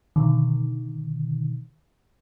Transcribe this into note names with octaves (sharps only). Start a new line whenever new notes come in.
B2 D3 D#3